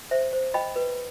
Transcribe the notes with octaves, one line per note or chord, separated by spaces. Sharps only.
C5 E5
C5
D#5 G5 B5
B4